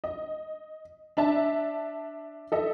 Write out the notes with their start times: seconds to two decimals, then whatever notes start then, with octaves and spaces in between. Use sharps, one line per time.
0.04 D#5
1.17 D4 E5 A5
2.52 A4 D#5 E5